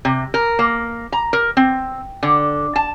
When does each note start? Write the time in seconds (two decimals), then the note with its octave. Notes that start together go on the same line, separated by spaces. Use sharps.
0.05 C3
0.34 A#4
0.59 A#3
1.12 A#5
1.33 A#4
1.57 C4
2.23 D3
2.76 A5